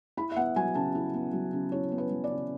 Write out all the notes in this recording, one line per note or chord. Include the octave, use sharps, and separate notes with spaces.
E4 B5
E5
B3 F#5
F#3 G#5
C#3 A5
E4
B3
F#3
C#3
E4 C#5
B3
B4
F#3
D5
C#3